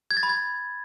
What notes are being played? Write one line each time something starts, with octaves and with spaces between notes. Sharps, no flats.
G#6
A6
B5
G#6